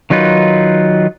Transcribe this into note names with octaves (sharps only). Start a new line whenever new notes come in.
D#3 F#3 D#4 F4 B4